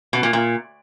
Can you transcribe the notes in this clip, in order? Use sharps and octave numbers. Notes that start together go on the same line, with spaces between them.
B2
A#2
A#2